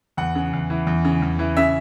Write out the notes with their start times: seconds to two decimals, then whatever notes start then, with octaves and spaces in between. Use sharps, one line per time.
0.17 E2 F#5
0.35 C#3
0.53 E2
0.70 E3
0.87 E2
1.05 C#3
1.22 E2
1.39 E3
1.57 C#3 E5